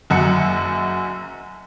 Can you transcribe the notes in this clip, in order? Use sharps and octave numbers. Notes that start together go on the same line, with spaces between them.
F#1 F#2 F#4 C#7